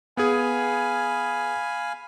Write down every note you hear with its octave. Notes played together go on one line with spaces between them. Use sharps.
B3 G#4 F5 G#5 B5